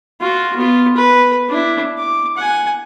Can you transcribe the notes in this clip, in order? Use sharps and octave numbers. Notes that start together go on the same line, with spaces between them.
F4 F#4
B3 F4
B4
D4 E4
D6
F#5 G#5